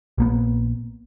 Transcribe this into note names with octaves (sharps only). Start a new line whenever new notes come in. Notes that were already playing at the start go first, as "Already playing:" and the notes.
A#1 A#3 B3